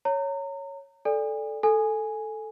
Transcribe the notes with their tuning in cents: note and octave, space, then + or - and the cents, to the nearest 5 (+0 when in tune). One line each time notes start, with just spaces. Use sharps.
C#5 +0 A#5 -30
A4 -5 D5 +0 G#5 -40
A4 +0 G#5 +0